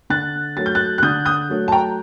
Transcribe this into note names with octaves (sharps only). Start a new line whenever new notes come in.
D3 F#6 A6
F#3 A3 A6
G6
F#6 A6
F#6
D3 D#6 G6
D#6 G6
F#3 A3
A5
G5 A#5